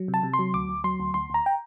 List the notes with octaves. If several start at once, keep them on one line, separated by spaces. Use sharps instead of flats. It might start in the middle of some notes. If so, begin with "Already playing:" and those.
Already playing: F#3
C3
A5
C3
C6
F#3
D2 D6
D2
F#3 C6
D2
D2 C6
D2 A#5
G5